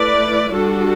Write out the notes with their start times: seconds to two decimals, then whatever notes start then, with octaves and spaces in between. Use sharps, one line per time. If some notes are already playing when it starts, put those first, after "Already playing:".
Already playing: A3 E4 B4 D5
0.52 G3 D4 F#4 A4